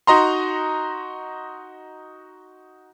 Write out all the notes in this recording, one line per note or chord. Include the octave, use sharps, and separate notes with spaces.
D#4 F#4 D#5 A#5 C6